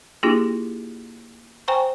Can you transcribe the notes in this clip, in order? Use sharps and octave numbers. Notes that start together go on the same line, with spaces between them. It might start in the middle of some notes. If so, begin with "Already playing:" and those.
A#3 D4 E4 F4 G4 G#4
C5 G5 G#5 A#5 C#6